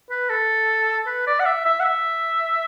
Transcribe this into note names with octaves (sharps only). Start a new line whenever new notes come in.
B4
A4
B4
D5
F#5
E5
E5
F#5
E5